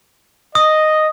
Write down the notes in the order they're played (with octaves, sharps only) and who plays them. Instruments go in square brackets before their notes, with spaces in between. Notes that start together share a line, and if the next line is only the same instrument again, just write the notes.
[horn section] D#5 [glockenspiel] D#6